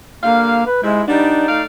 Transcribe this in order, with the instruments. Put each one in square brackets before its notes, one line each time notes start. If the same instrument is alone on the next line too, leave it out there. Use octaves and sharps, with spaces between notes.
[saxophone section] D3 G3 F5 [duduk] A#3
[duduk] B4
[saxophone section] G#2 C3 E4 [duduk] G#3
[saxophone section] G3 B3 D4 [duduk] D#4
[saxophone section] A3 D5 F5